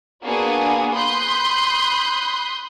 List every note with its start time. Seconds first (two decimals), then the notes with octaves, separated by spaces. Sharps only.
0.22 A#3 B3 D4 F#4 G#4 G#5
0.93 B5 C6 D#6 F#6 G6